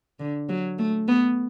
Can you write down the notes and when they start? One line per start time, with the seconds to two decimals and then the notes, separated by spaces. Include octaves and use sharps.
0.19 D3
0.49 F#3
0.79 A3
1.08 B3